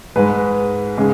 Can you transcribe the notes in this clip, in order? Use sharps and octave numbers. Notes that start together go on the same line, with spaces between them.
G#2 G#3 B4
C#3 G#3